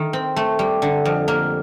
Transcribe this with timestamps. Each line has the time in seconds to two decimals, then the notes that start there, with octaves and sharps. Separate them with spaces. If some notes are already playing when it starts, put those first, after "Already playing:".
Already playing: D#3 A3
0.13 C4
0.36 A3
0.59 G3
0.82 D3
1.05 F2
1.28 A#3